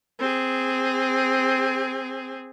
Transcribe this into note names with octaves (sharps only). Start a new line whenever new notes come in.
C4 G#4